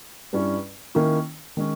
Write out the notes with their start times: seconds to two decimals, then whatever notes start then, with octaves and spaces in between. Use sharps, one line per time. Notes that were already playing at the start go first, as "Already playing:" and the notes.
0.33 G2 G3 C#4 E4
0.95 D#3 A#3 C#4 E4
1.57 D#3 G#3 C#4